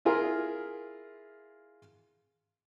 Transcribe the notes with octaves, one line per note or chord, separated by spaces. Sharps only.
E4 F4 G#4 A#4